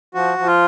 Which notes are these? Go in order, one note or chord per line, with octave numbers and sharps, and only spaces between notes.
F3 F#4
F3
F4